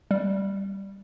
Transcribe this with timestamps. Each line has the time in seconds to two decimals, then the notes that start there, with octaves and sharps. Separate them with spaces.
0.11 G3